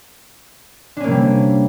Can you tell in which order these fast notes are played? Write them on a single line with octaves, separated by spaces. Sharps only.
D4 C#4 A#3 C3 G3